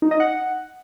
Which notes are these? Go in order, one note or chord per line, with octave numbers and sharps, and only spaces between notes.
D#4
D#5
F#5